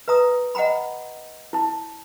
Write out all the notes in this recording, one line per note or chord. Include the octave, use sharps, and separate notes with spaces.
B4 E5 A#5 D#6
D#5 F#5 G5 A#5 B5
E4 A5